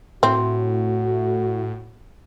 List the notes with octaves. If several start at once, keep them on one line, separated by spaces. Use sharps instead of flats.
A2 C4 F#4